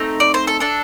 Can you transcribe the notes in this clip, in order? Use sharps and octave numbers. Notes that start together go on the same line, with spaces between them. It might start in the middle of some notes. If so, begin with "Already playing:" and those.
Already playing: A3 C4 D#4
D5
C5
A4
D4 A4